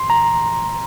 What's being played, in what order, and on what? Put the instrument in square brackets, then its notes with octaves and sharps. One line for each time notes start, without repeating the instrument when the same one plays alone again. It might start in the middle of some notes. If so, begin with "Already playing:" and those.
Already playing: [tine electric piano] C6
A#5